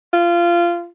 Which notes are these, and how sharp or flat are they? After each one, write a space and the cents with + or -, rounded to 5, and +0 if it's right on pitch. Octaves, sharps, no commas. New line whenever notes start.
F4 -20